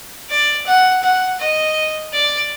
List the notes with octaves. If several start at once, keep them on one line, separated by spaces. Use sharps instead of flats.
D5
F#5
F#5
D#5
D5